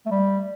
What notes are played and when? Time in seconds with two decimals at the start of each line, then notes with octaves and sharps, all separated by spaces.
0.06 A3
0.11 G3